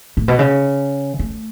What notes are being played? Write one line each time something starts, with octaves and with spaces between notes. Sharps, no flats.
A2
B2
C#3
A3